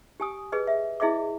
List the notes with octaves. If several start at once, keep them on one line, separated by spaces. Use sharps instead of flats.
G4 G#5 D#6
G#4 B4 D#5
E5
E4 G#4 D#5 E5 D6